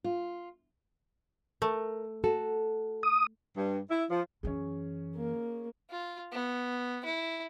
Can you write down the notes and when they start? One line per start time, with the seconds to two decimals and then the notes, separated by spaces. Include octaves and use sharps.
0.04 F4
1.62 A3 A#4
2.24 F#4 A4
3.03 D#6
3.56 G2
3.90 E4
4.10 F3
4.43 F#2 E3 C#4 G#4
5.15 A#3
5.90 F4
6.32 B3
7.05 E4